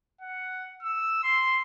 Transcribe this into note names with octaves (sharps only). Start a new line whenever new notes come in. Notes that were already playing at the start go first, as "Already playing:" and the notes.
F#5
E6
C6